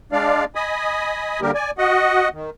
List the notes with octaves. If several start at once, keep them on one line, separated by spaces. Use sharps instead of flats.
G#3 D4 D5 F5
D#5 G#5 B5 D#6
D3 G3 A#3 G4 A#4
D5 G#5
F#4 D#5 F#5
D#3